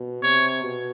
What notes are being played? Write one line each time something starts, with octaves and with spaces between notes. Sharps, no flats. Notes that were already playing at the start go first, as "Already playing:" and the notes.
Already playing: B2
C3 C#5
B2